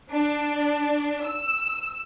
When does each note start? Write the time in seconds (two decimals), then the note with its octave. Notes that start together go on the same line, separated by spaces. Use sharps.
0.10 D4
1.22 E6